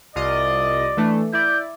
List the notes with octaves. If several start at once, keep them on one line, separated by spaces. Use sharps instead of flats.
C2 F4 D5 D#5
E3 A3 D4
E4 D5 G6